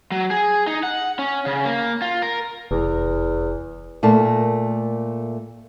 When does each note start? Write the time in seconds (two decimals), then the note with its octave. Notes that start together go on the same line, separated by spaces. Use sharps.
0.12 F#3
0.31 G#4
0.67 D#4
0.83 F#5
1.19 C#4
1.46 C#3
1.65 A#3
2.02 F4
2.22 A#4
2.71 F1 E2
4.03 A#2 A3 A#3 A5